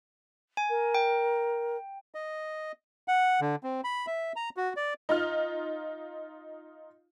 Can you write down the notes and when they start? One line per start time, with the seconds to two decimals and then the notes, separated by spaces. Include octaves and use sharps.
0.57 G#5
0.69 A#4
0.95 G5
2.15 D#5
3.08 F#5
3.41 D3
3.63 C4
3.84 B5
4.07 E5
4.36 A#5
4.57 F#4
4.76 D5
5.09 D#4 F4 F6